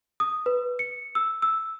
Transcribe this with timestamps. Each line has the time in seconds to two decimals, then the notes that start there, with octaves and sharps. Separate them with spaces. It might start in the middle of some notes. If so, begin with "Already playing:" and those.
0.20 D#6
0.46 B4
0.79 C#7
1.15 E6
1.42 E6